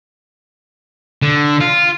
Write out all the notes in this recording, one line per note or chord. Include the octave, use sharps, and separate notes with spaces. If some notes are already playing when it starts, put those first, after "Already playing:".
D3
F4